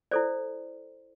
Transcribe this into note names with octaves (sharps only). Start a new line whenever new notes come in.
E4 A4 C5 D5